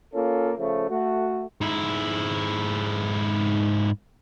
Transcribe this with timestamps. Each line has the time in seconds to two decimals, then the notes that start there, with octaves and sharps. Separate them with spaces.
0.14 A#3 C#4 F4 A4
0.58 C#3 F3 A3
0.90 A3 F#4
1.61 G#2 E4